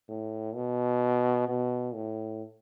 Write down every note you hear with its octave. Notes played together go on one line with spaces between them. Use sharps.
A2
B2
B2
A2